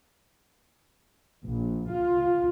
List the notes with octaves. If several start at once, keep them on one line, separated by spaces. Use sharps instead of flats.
A#1
F4